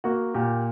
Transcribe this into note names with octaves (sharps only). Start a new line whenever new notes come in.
A#3 F#4
A#2 G4